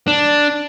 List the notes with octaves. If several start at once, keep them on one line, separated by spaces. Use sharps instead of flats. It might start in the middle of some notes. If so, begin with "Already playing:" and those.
D4